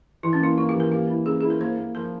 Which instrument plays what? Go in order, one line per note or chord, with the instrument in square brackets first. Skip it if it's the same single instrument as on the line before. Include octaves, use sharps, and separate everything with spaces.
[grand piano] E3 [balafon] E4
[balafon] C#4
[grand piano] A#3 [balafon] E4
[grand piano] A#3 [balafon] F4
[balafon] G4
[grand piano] E3
[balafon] A#4
[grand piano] A#3 [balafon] G4
[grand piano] E4
[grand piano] C#3 [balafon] G#4
[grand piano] E4 [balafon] G#4
[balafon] A#4
[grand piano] A#3 [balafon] C5
[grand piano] A#3
[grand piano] F3 [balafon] A#4